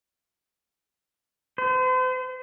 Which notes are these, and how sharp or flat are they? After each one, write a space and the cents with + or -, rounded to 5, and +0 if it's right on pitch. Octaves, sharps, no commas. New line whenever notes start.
C5 -40